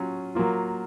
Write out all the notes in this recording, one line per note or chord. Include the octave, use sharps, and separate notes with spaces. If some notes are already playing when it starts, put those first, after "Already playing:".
Already playing: F#3 C#4 F4
F#3 A#3 F4